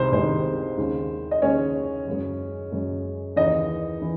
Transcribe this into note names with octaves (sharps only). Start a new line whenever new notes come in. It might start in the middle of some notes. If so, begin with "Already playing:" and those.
Already playing: C2 C3 D#3 G#3 C5
C2 C3 D#3 G#3 C5
D#2 C#3 G#3
D#5
D#2 C#3 G#3 C#4 C#5
F#2 C#3 G#3
F#2 C#3 G#3
D#2 C#3 E3 D#4 D#5
E3